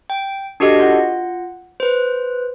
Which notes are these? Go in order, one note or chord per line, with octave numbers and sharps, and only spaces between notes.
G5
D4 F#4 G4 A4 D#5
F4 F#5
B4 C5